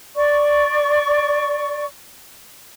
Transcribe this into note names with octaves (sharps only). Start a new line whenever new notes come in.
D5 C#6